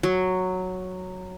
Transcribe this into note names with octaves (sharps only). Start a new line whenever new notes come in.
F#3